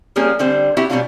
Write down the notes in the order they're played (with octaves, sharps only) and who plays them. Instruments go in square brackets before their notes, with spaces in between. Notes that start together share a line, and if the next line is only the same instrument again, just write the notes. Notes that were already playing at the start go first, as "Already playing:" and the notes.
[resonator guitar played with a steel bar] F3 G3 A#3 C#4 G#4
D3 G3 C4 C5
B3 C4 E4 F#4 G4
B2 F#3 G3 C4 D4 F4